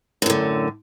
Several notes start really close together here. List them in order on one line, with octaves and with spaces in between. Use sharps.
F#2 A2 D3